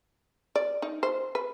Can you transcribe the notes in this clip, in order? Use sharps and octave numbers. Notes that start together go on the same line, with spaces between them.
D5
D#4
C5
B4